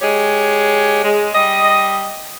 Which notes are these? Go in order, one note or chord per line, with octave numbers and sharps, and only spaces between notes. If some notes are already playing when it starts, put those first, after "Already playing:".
G#3 G4 C#5
G#3
G3 D#5